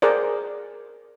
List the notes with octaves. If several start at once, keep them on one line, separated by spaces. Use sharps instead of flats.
G#4 A#4 C5 D5